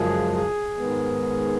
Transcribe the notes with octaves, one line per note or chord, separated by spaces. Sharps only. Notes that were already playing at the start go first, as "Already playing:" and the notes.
Already playing: F#2 C#3 F3 G#3 G#4
G#4
G#2 D#3 G#3 B3